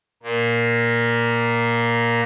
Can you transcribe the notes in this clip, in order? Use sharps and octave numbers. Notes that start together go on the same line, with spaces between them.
A#2 A#3